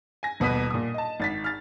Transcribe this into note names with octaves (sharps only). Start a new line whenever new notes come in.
G#5 A#6
D#1 B2 B4 D#6 B6 D#7
A#2 D#6
D#5 A5
G#1 A6 B6
F6 A6